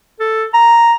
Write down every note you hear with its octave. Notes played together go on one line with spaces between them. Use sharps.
A4
A#5